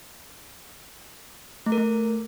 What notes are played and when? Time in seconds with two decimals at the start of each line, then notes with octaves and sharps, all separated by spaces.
1.66 A3
1.72 A#4
1.78 A3